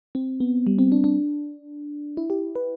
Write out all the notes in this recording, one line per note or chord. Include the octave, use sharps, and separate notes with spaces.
C4
B3
G3
C4
D4
D4
E4
G4
B4